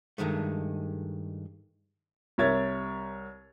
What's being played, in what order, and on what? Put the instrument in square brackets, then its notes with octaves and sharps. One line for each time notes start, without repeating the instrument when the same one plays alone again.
[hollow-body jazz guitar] G2 D#3 G#3 A3
[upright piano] C2 A#4 C#5 E5 G#6 A6